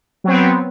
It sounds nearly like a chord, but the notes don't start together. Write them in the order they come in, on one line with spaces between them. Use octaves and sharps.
F#3 C4 B3